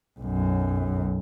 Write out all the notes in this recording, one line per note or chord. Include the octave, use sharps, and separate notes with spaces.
B1 F#2